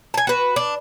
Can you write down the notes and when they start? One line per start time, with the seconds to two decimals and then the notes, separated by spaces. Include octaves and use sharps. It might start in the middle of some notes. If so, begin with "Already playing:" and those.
0.14 G#5 A5
0.27 F#4 B4
0.56 D4